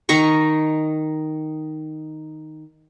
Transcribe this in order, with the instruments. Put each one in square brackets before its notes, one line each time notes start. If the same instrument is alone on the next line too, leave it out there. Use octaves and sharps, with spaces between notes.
[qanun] D#3 D#4 A#5 C#6